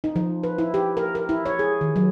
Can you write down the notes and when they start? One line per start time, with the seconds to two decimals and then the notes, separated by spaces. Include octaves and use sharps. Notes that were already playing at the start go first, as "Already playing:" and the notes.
0.04 D#4
0.16 F3
0.43 B4
0.58 E4
0.74 G4
0.97 A#4
1.15 A#4
1.29 E4
1.46 C#5
1.59 G#4
1.81 D#3
1.96 F#3